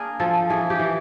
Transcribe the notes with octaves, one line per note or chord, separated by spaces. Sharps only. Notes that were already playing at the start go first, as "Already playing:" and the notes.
Already playing: A#3 D4 G#4 A#4
F3 A4
E3 G#4
G4
E3